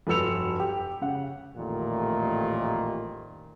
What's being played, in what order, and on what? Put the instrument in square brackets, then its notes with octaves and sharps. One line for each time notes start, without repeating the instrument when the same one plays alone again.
[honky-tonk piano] F1 G2 F#3 E6 C#7 F7
G4
C#3 F#5
[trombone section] A1 F2 A#2 D#3 G3 A3